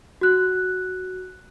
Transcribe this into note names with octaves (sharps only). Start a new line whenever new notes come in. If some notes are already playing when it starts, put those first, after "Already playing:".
F#4 F#6